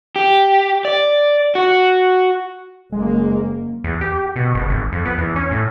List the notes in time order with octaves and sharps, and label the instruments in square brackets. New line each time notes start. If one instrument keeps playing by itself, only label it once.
[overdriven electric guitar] G4
D5
F#4
[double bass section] F#1 A#3 [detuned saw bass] G#3
[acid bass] E2
G4
B2
F#1
G#1
F2
B3
E2
C#4
A2